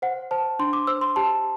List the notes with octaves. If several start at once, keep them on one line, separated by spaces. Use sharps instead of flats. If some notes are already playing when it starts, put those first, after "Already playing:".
C5 F#5
C5 A5
D4 C6
D6
C5 E6
C6
G4 A5